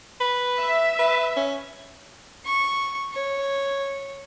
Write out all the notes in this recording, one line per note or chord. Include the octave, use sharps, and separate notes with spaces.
B4
E5
B4
C#4
C#6
C#5